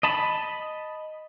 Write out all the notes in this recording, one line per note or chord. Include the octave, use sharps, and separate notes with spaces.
D#5 A5 B5